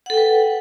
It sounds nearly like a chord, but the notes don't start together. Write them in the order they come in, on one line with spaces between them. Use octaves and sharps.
F#5 A4 G5 B4